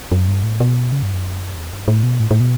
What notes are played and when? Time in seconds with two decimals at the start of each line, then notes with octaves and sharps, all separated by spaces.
0.12 F#2
0.28 G2
0.44 A2
0.60 B2
0.92 C#3
1.03 G2
1.14 F#2
1.55 E2
1.71 G2
1.88 A2
2.03 B2
2.20 A2
2.31 A2
2.40 B2